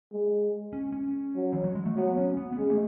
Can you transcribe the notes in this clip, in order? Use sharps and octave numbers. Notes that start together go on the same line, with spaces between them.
G#3
C#4
C#4
F#3
E3
F#3
G#3
A3
F#3 B3
C#4
B3
B3
G#3 C#4
A3